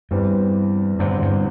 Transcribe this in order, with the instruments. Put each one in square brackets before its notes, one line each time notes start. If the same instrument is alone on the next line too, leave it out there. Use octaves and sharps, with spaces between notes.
[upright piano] E2 E3 G3 C4 [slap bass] G2
[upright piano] E1 E2 D3 C4 E4 [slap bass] G2
[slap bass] G2